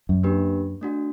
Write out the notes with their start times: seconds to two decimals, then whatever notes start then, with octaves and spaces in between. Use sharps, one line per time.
0.09 F#2
0.23 A#3 D4 G4 B4
0.81 A3 D4 F#4